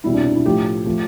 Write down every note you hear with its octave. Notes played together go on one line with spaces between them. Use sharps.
C2 B2 G3 E4
D4
D4
E4
A2 F3 A3 G4
F3 A3